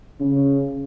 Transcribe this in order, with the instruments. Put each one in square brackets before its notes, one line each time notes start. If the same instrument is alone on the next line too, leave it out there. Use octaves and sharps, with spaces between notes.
[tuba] C#3